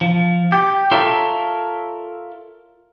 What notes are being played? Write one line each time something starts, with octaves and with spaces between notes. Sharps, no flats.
F3
G4
F4 A4 A#4 C#5 E5